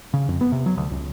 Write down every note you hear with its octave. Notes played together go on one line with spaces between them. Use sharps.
C#3
F2
B3
C3
F#3
D2
C#2